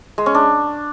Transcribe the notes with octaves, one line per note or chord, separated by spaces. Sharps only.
G#3
C#4
D4